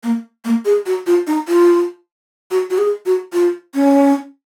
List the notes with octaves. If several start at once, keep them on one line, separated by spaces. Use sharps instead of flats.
A#3
A#3
G#4
F#4
F4
D#4
F4
F#4
F#4
G#4
F#4
F4
C#4